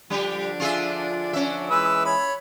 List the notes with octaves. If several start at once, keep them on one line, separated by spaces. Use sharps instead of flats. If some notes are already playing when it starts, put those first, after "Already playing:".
D3 F3 G3 D4 G4
F4 G#4 E5
C#4 E5
E3 G#3 B4 E6
C#5 B5